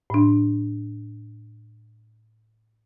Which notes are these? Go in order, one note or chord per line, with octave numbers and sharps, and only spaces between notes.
A2 D4